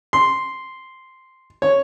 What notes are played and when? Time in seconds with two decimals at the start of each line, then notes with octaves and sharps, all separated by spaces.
0.13 C6
1.62 C#5